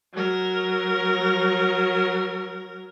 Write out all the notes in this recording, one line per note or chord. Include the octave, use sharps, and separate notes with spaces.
F#3 A#4